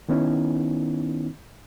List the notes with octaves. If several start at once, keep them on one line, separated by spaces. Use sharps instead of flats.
D#3 B3 C#4 D#4 E4